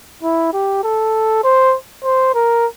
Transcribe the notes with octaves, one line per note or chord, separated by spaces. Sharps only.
E4
G4
A4
C5
C5
A#4